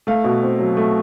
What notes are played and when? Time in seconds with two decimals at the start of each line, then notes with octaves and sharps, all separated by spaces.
0.07 A3 F5
0.24 B2
0.42 C4
0.59 F#3
0.77 A3